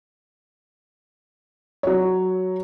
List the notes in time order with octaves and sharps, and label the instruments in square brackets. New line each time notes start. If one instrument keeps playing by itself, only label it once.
[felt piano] F#3 C#5